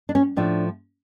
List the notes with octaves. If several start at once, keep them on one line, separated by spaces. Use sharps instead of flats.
D4
C#4
A2 F3 A3 D4